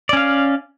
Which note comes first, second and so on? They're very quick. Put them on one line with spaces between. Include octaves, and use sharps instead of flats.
D5 C#4 F5